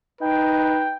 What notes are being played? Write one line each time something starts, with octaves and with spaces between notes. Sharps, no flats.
D#4 B4 G5